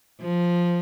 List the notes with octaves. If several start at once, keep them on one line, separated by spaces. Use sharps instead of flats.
F3